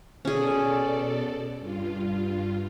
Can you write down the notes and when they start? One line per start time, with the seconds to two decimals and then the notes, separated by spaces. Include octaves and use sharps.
0.25 B2 C#4 G#4 A4 D5
1.58 G2 F4